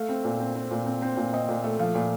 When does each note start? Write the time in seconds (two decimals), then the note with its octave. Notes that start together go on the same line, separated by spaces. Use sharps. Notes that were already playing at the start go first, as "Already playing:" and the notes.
Already playing: A3 F5
0.09 C4
0.24 A#2
0.40 C4
0.56 C4
0.71 A#2
0.86 C4
1.02 C4
1.17 A#2
1.33 C4 D#5
1.49 A#2
1.64 A3
1.79 F3 F5
1.95 A#2